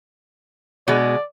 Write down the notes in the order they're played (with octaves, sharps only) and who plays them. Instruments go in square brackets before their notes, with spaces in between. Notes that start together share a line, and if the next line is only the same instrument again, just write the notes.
[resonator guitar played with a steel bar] B2 G#3 [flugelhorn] D5